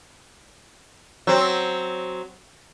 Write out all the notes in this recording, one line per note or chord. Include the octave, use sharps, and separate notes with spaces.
F#3 C4